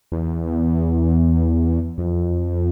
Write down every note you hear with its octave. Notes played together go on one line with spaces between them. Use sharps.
E2
F2